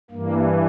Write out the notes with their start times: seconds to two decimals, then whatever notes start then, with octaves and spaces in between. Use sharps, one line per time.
0.11 G2 E3 A#3